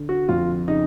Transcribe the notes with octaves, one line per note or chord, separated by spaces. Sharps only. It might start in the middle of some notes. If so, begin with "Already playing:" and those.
Already playing: D3
F#4
F2 F4
C#3 D#4